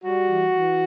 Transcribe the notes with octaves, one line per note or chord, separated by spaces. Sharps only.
G3 F#4
E3
E3